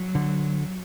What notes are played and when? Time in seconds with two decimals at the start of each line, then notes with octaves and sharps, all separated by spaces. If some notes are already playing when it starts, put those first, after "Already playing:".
Already playing: F#3
0.15 D3